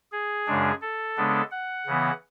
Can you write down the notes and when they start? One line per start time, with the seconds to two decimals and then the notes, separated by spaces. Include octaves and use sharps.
0.12 G#4
0.47 F#2 C#3 G#3 D4
0.82 A4
1.17 C#3 G#3 B3 D4
1.51 F#5
1.86 C#3 E3 B3